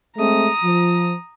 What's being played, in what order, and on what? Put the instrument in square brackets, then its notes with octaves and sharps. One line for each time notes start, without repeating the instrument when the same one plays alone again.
[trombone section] G#3 A3 C4 [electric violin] A#5 D#6
[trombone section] F3